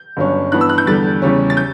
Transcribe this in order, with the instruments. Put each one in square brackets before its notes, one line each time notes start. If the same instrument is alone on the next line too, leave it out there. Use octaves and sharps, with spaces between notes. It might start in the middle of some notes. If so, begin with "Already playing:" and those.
Already playing: [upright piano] G6
G1 G2 F#3 C#4
G2 E3 B3 F#6
E6
F#6
G6
E2 D3 G3 A6
E2 C#3 G3 C#4
A6
G6